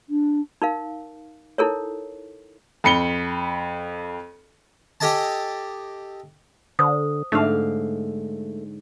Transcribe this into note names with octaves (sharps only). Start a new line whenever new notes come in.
D4
D#4 A#4 F5
D#4 E4 A4 A#4 C#5
F2 B5 C#7 G7
G4 A4 D#5 G#5 A5
D3 C5 D#6
G#2 D3 A3 F5